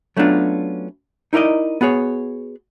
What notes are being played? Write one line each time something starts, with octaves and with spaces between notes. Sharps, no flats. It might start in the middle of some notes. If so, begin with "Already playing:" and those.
F#3 A3 B3 C#4 D4 F4
D#4 E4 A#4 D5 D#5
B3 F#4 G#4 C#5